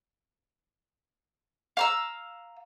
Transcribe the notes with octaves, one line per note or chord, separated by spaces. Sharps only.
F5 A#5 E6